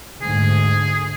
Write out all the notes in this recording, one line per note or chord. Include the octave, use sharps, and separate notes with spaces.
D2 G#2 G#4